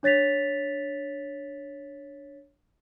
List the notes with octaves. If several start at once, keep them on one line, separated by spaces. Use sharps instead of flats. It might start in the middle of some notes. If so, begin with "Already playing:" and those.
D4 C#5 A6 B6 F7